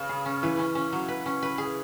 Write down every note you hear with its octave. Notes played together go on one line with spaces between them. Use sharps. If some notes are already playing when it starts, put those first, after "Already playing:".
Already playing: C#3 B4
G#4
C#4
E3 B4
C#4
C#4
F#3
B4
C#4
B4
G#4